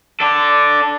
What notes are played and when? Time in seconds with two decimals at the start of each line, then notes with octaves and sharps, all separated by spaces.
0.20 D4 A4